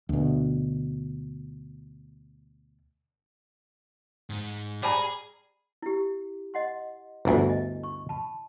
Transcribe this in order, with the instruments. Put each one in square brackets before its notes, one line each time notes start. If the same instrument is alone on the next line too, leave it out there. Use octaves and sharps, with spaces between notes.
[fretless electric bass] D2 B2
[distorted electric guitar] G#2
[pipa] G3 G#5 A#5 [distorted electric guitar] G#4
[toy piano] E4 G4
D#5 F#5 C6
[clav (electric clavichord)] G1 D2 [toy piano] E4 E5 G#5
[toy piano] D#5
C#6
A5 B5